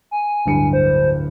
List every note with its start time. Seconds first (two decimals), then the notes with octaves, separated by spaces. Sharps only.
0.11 G#5
0.46 D1 G2 C#7
0.73 C5